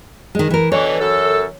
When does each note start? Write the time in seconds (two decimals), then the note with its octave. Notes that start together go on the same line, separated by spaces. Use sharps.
0.35 D#3 G#3
0.50 E3 A#4
0.72 B2 D3 E3 C#5
1.00 F#2 A4